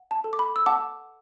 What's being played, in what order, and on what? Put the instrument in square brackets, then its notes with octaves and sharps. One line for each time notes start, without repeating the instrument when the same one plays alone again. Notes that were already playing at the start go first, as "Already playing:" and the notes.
Already playing: [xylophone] F#5
A5
A4
D6
B5
E6
F#5 A5 D6